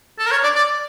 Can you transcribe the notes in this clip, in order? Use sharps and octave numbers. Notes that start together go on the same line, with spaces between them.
A4
A#4
C#5
D5
D5